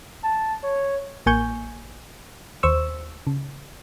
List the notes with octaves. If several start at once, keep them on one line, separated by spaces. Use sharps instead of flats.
A5
C#5
A1 A#3 G#5 C#6 G6
D#2 C5 C#6 E6
C#3